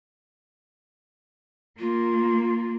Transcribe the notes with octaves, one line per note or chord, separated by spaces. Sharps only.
A#3 F4